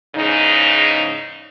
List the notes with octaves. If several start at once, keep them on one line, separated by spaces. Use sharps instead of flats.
E2 G#2 C#3 D#4